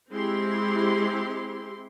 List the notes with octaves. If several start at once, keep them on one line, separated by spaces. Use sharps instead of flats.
G#3 C4 E4 G4 C6